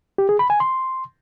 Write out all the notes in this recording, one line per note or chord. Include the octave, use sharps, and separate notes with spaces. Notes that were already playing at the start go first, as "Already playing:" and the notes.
G4
G#4
B5
G#5
C6